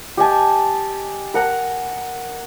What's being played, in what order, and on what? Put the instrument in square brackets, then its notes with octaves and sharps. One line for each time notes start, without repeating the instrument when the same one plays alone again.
[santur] G4 D#5 G#5 A5
A#4 F#5 A#5